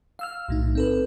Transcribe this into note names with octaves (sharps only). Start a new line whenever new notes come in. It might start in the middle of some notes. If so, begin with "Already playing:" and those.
F5 E6 F6
B1 A2 D#4
C4 A4 B4